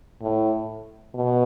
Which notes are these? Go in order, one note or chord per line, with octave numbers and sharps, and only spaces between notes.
A2
B2